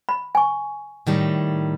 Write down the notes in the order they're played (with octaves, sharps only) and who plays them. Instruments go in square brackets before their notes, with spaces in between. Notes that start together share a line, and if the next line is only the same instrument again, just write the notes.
[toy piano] B5
G#5 C#6
[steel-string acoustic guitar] A2 D#3 G3